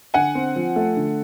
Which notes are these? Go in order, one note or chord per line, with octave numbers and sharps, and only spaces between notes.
D3 F#5 G#5
C4
F3
A3
D3